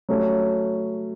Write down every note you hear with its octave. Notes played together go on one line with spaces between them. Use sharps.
F#3 A3 C#4